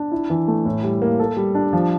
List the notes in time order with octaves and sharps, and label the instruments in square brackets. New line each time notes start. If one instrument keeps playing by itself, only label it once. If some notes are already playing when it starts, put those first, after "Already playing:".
Already playing: [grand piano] D4
E4
E3
A3
A2
G3
A#3
A4
G3
D4
F3